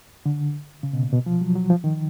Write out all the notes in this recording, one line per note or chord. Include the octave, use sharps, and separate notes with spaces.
D3
C#3
B2
A#2
B2
F3
F#3
F#3
F3
D#3